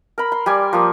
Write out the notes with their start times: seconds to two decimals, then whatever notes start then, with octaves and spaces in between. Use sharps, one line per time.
0.18 A#4 B5
0.32 C6
0.46 G3 D5 G#5
0.73 F3 A#3